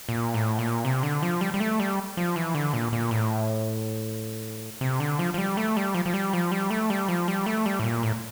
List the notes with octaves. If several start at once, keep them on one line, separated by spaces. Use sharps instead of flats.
A#2
A2
A#2
C3
D3
F3
G3
G3
A3
G3
F3
E3
D3
A#2
A#2
A2
C3
D3
F3
F3
G3
A3
G3
F3
F3
G3
F3
G3
A3
G3
F3
G3
A3
G3
A2
A#2
A2